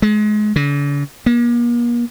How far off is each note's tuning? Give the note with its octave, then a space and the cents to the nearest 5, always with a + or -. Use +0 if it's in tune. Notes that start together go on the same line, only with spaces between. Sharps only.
G#3 +30
D3 -45
A#3 +40